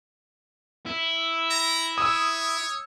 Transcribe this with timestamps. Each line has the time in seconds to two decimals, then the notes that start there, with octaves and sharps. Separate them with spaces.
0.86 E4
1.51 A#5
1.98 C#5 D#6 E6